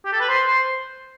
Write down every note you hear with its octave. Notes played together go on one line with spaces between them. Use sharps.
G4
A4
B4
C5
C5